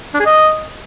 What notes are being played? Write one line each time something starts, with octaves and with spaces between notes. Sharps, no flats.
D4
G#4
D#5